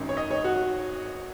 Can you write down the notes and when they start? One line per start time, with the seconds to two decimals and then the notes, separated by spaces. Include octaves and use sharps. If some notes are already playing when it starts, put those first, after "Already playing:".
Already playing: G#1 F#2 D#3
0.09 C#5
0.17 D#5
0.31 C#5
0.44 F#4